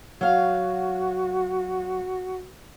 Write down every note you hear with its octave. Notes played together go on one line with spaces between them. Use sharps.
F#3 F#4 F5